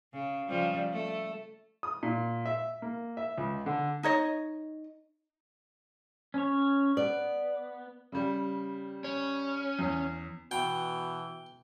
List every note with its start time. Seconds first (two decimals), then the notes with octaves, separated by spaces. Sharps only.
0.13 C#3
0.47 C#3 F3 G3
0.92 A3
1.83 D#6
2.03 A#2
2.46 E5
2.82 A#3
3.17 E5
3.38 C#2
3.66 D3
4.03 D#4 C#5 D#5
6.34 C#4 C#5
6.97 B3 D5
8.12 C#3 G3
9.04 C#4
9.79 E2
10.51 B2 E3 G5